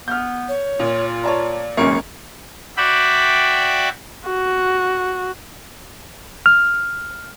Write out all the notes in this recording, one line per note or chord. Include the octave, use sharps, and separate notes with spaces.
B3 F6 G6
C#5
A#2 F4
C#5 D5 A5 A#5
G#1 C#2 F#2 A#3 C#4 C#6
F#4 D5 E5 G5 B5
F#4
F6